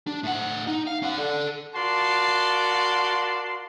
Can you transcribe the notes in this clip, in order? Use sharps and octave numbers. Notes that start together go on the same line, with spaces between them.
D4
A2 F#5
D#4
F5
C#4 F#5
A4 D5
F4 F#4 A#4 D5 A5 C6